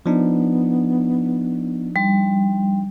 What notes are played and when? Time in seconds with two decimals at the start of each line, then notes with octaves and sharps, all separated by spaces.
0.06 F3 B3 D4 D#4
1.96 G3